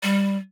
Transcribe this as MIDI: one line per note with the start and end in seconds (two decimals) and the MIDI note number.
0.03 0.37 55